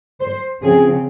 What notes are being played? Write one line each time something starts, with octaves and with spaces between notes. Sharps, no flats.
C5
C#3 F3 C4 G#4